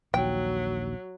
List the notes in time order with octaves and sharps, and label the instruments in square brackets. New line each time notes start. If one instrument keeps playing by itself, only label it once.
[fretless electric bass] A#1 D#2 [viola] F#3 [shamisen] G5